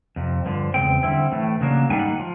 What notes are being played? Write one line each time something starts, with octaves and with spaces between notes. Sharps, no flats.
F2 C3
G2 D3 F3
E2 C#3 F3 G#3 C4 G5
D3 G3 C4 E4
A2 E3 A3
C#3 F#3 A#3 D4
G#2 D#3 G3 A#3 D4 G#5
F#5
F3